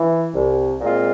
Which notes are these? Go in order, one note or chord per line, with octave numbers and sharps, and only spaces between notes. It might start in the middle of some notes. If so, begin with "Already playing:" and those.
Already playing: E3
C2
A#2 G#3 C4 F4